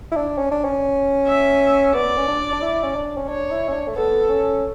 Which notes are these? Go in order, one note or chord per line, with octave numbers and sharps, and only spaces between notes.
E4
D4
C#4
D4
C#4
E5
B3 D5
C#4
D4
D4
E4
C#4
D4
C#4
D4 C#5
E4
C#4
D4
A3
B3 A4
C#4